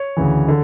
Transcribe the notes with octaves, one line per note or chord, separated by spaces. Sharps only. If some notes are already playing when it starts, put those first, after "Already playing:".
Already playing: C#5
D2 C#3 E3
D3